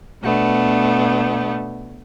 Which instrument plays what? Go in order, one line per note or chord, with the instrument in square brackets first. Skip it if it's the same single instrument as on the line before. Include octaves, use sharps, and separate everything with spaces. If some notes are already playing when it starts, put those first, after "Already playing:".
[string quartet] B2 A3 B3 D4